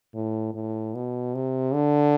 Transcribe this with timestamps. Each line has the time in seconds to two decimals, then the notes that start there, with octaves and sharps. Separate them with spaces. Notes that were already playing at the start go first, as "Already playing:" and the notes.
0.14 A2
0.54 A2
0.94 B2
1.34 C3
1.74 D3